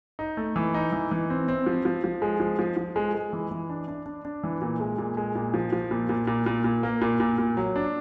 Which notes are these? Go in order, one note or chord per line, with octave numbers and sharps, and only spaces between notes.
D#4
A3
E3
D#4
E3
E3
C4
C4
F3
F3
F3
G#3
F3
F3
F3
G#3
G#3
E3
E3
D4
D4
D4
D4
E3
A#2
G#3
A#2
G#3
A#2
F3
F3
A#2
A#2
A#2
A#2
A#2
A#3
A#2
A#2
A#2
F#3
D4